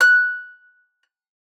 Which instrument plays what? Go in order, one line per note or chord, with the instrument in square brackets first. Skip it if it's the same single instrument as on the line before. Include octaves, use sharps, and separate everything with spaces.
[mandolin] F#6